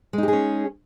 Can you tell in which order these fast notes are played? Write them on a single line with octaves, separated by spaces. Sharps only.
G#3 D#4 G4 G#4 C#4